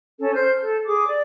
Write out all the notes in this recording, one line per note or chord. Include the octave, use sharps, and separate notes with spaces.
C#4 A4
C5 F6 G6
A4
G#4 D6
D5